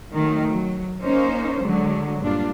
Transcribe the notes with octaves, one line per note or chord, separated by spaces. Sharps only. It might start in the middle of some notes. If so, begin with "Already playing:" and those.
D#3 F#3 A3
F#3
A#3 C#4 D#4 C5
D3 F#3 G#3
G2 A#2 D4 F4